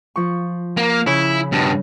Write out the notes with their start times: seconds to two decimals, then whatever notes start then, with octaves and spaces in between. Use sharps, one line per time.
0.16 F3 C#6
0.77 A#3
1.06 C#3 E4 C#5 B5
1.52 G2 B2